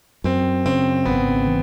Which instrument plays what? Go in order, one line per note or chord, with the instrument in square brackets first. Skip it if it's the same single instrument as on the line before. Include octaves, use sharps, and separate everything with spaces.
[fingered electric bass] F#2 [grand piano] C4
[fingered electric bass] C#3 [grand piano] C4
[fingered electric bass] G#1 [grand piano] B3
[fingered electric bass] E3